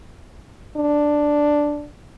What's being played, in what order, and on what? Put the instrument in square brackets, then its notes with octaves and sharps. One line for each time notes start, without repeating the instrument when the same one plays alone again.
[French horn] D4